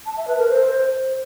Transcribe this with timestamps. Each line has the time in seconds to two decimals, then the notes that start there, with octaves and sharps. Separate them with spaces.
0.06 A5
0.17 E5
0.28 B4
0.38 A#4
0.49 C5